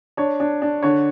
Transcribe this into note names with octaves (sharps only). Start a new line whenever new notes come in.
D4 C#5
D4
D4
D3 C#5